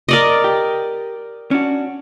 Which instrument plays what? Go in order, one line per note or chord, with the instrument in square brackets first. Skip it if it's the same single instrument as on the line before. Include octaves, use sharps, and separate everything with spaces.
[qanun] A#4 D5 D#5
[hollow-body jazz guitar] G4
C#4 D4 F#4